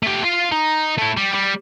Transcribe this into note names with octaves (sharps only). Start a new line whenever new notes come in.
A3 G4
F4 F5
D#4
A3 E4
G3
G3